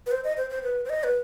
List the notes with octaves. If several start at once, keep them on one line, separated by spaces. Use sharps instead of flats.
B4
C5
D#5
C5
C5
B4
C5
D#5
B4